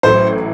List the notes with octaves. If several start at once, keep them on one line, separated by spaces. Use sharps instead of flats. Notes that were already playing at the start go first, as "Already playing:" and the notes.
A1 A2 F#3 A3 C5